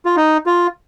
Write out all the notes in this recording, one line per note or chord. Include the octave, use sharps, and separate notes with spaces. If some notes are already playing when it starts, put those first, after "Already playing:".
F4
D#4
F4